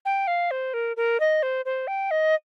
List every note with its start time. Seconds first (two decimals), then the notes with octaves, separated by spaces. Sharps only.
0.05 G5
0.27 F5
0.51 C5
0.74 A#4
0.97 A#4
1.20 D#5
1.43 C5
1.65 C5
1.87 G5
2.11 D#5